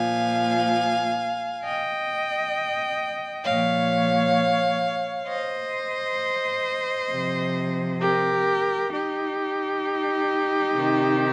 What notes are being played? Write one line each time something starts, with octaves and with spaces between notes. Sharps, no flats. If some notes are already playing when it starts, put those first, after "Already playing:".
Already playing: A#2 F3 F5 G#5
D#5 G5
A#2 F3 C#5 F5
C5 D#5
C3 F3
G4 A#4
D#4 G4
C3 D#3